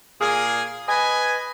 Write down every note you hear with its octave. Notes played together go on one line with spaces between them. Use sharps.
A#2 A#3 G#4
B4 D#5 G#5